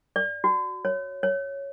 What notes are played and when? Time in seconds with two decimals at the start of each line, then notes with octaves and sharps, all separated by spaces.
0.16 D5
0.44 F#4
0.85 C#5
1.23 C#5